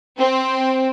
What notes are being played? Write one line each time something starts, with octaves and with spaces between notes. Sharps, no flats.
C4